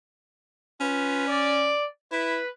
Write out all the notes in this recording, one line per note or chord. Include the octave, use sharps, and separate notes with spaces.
C#4 F4 B4
D5
E4 B4